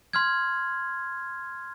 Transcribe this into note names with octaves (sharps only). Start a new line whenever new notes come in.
C6 F6 G#6